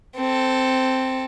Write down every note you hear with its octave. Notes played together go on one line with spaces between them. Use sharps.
C4 A4